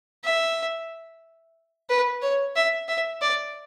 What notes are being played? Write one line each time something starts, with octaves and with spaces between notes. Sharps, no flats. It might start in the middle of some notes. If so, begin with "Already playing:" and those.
E5
B4
C#5
E5
E5
D5